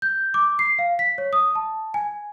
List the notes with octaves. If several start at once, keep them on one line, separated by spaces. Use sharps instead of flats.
G6
D6
C7
F5
B6
C#5
D#6
A5
G#5